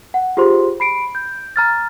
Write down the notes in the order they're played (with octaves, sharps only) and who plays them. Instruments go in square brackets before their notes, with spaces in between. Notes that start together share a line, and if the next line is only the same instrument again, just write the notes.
[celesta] F#5
F4 G4 G#4 C5 C6
B5 C7 D7
G6
A#5 F6 A6